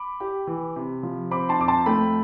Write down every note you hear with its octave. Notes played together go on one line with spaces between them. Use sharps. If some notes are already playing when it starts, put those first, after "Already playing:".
Already playing: B5 D6
G4
E3
C3
F3
C4 B5 D6
A5 C6
F2 D6
A5 C6
A3 G5 B5